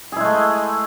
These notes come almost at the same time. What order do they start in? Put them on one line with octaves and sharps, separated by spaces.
G#4 E4 G#3 A3